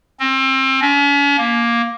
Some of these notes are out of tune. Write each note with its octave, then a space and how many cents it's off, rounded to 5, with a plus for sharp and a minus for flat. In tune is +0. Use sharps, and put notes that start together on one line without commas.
C4 +30
C#4 +40
A#3 +10